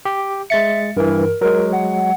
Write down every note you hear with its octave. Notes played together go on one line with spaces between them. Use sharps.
G4
G#3 E5 A6 C#7
G2 E3 A#4
F#3 G#3 A#4
F#5